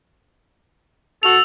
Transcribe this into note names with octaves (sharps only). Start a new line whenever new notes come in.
F#4 A4 E6 F7